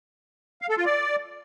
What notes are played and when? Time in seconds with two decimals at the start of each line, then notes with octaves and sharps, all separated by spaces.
0.62 F5
0.69 A4
0.77 F4
0.85 D5